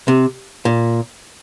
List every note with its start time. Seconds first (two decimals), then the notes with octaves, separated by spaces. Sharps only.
0.08 C3
0.65 A#2